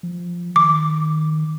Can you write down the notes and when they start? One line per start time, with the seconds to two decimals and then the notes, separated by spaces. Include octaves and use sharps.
0.03 F3
0.56 D#3 D6